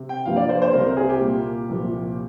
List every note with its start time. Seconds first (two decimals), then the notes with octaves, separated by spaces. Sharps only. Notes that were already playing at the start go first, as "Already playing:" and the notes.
Already playing: C3
0.09 G5
0.25 G2 F3 A#3 F5
0.36 D5
0.49 C5
0.62 C5
0.73 C2 C3 G3 C4 A#4
0.86 A#4
0.97 G#4
1.09 G4
1.21 A#2 G3 A#3
1.69 C2 A#2 F3